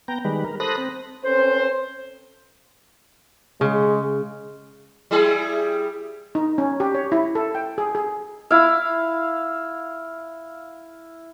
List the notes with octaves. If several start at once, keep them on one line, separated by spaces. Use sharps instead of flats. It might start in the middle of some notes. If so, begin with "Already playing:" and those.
B3 G5 A#5
D#3 G3 G#3 B4
A#4
A4 C5 B5 D#6 F#6 A#6
C4
C4 C#4 A4 B4 C5
C#3 G#3
G3 E4 G#4
D#4
C#4
G4
C#5
E4
A4
G5
G#4
G#4
E4 F5